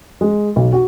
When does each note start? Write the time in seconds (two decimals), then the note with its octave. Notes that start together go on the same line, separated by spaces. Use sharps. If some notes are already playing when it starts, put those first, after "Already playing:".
0.21 G#3
0.56 B1
0.73 F#4